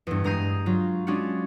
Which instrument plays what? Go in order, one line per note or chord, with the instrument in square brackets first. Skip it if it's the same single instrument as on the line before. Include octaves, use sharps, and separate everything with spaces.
[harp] E2 G2
G2 G#3 A#5 D#6 G6 C7
F#3 F4
G#3 C#4 D4 F4 F#4